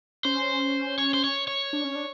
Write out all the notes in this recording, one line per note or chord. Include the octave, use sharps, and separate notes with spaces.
C#4 C5
C#5
C5
C#5
C#5
D4
C#4
D4